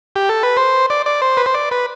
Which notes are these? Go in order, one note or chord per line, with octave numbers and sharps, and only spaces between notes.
G4
A4
B4
C5
D5
D5
C5
B4
C5
D5
B4